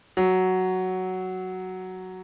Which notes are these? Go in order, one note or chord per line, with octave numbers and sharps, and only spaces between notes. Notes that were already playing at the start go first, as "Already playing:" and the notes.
F#3